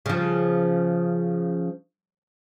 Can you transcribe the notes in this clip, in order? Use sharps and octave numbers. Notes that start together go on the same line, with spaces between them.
C#3 F3